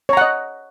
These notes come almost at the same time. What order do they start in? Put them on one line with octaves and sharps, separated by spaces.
C#5 A#5 F#5 D#5